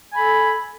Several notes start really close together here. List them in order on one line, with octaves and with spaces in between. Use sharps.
G#5 B5 A4